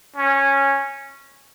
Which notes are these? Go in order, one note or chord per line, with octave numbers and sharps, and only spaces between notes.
C#4